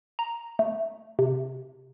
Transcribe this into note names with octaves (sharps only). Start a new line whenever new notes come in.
A#5
A3
C3